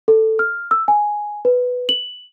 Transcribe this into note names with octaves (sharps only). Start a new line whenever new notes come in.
A4
F6
E6
G#5
B4
F#7